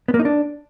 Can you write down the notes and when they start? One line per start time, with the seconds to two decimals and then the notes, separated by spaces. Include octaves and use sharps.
0.08 B3
0.14 A#3
0.20 D#4
0.25 D4